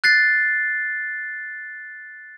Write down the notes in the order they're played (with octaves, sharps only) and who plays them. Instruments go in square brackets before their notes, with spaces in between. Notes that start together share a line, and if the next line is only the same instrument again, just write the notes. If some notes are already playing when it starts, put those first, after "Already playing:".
[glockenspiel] F#6 A6 C7